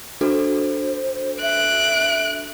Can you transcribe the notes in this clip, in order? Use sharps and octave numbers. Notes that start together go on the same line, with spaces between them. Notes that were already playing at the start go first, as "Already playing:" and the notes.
D4 F#4 A4 C5
E5 F#6 D7